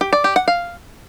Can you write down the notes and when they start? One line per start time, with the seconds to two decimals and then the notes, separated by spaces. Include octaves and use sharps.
0.01 G4
0.13 D5
0.24 G4
0.36 F#5
0.48 F5